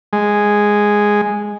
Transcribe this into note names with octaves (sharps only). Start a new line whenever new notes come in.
G#3